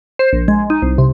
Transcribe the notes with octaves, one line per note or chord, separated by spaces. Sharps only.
C5
A#1
G#3
D#4
C2
C3